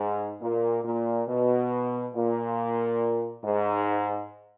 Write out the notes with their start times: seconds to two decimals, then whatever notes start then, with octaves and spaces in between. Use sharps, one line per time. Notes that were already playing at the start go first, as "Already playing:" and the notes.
Already playing: G#2
0.41 A#2
0.83 A#2
1.28 B2
2.14 A#2
3.44 G#2